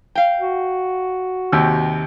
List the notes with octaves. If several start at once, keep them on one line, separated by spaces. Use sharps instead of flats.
F5 G5
F#4
D#2 C3 E6